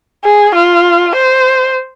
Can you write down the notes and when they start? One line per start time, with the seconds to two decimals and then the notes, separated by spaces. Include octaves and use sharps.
0.24 G#4
0.55 F4
1.15 C5